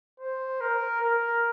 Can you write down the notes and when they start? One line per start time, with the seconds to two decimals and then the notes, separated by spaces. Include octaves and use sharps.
0.20 C5
0.61 A#4
1.01 A#4